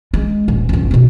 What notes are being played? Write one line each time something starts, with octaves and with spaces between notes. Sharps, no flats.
G#3
D#1
G1 C#2
B2 B3